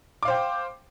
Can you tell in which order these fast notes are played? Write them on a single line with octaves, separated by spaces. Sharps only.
D6 F5 C5 G5